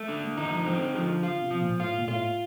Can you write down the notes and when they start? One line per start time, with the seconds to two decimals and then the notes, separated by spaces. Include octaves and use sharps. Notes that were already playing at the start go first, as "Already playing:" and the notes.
Already playing: A3
0.08 D3 D4
0.23 A#3
0.37 D#3 D#4
0.52 F3
0.66 F3 C4
0.80 D3
0.94 D3 F3
1.08 D3
1.22 D3 F4
1.42 C3
1.51 F3
1.61 A#2
1.80 A2 F4
1.98 A#2
2.08 A2 F4